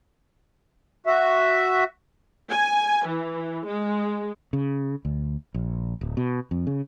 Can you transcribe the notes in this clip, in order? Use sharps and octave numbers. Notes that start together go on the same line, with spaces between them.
F#4 E5
G#5
E3
G#3
C#3
D2
A#1
D1
B2
F2
C#3